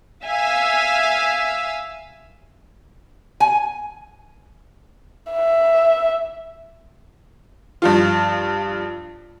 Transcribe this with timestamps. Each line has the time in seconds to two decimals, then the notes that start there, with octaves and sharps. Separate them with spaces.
0.24 E5 F5 G#5 E6
3.40 G#5
5.31 E5
7.82 G2 F3 F4